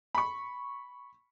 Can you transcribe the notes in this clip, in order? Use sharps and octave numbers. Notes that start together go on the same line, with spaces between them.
B5 C#6